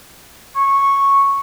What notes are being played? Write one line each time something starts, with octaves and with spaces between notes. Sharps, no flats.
C#6